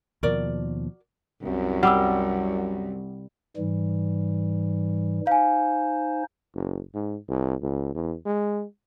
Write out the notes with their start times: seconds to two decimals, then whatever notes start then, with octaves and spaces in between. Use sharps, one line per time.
0.23 D#2 B2 F3 F#4 A#4 D5
1.44 C2 F#2
1.83 G3 F#5 D6 E6
3.57 G#2 E3 G3
5.27 D#4 C5 F5 G#5
6.55 F#1
6.94 G#2
7.28 C2
7.62 C#2
7.95 E2
8.26 G#3